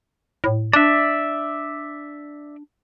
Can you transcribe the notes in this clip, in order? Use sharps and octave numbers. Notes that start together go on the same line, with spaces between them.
A2
D4 D5 E5